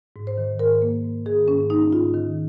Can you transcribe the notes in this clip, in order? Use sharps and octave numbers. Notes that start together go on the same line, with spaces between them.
G#2
C5
D#3
G#2 A#4
A#3
G#2
D#3 G#4
G#2 C#4
A#3 D#4
G#2 F4
D#3